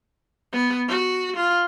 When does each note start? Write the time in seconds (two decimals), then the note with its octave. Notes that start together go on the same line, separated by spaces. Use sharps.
0.53 B3
0.88 F#4
1.36 F4